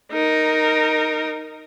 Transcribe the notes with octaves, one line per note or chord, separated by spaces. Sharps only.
D#4 A#4